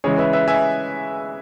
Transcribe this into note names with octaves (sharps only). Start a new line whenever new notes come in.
C#3 E3 G#3 G#4 C#5
B4 E5
B4 E5
E5 G#5